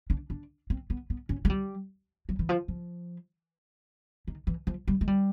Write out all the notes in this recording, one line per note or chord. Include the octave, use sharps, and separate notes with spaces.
D4
D4
C4
B3
B3
C#4
G#3
G3
F#3
E3
F3
F3
D#3
E3
F3
G3
G#3
G3